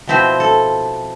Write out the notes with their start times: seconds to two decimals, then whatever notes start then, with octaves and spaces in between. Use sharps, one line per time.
0.07 B2 F3 C4 E4 C5
0.40 A4